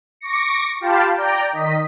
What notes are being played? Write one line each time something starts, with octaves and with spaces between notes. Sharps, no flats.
C#6 D6 A#6 C#7
F4 G4 F5 G5 A5 B5
D5 G5 A#5
D#3 D#5 B6